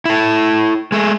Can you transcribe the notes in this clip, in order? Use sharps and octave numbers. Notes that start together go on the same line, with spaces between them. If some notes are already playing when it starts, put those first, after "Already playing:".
E4 A4
G#3 A3